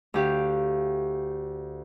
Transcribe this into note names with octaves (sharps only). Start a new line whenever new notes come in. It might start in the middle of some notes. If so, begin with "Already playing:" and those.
D2 G4 F5